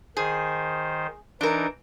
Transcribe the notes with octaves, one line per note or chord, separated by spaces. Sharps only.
D#3 G#4 C5
E3 D4 D#4 A#4